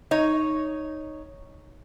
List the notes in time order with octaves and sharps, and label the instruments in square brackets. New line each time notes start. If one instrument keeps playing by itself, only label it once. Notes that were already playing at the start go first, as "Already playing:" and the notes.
[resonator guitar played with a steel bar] D#4 C#5